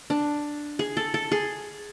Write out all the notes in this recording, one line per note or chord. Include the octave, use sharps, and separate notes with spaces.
D4
G#4
A4
A4
G#4